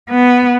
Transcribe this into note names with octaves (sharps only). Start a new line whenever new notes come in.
B3